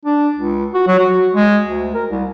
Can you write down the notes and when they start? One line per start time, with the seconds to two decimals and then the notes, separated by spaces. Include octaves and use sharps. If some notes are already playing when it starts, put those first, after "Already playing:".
0.05 D4
0.36 C#2
0.74 F#4
0.87 F#3
0.99 F#4
1.33 G#3
1.66 D2
1.94 A#4
2.09 C2